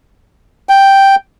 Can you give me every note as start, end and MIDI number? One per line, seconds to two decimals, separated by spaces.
0.69 1.15 79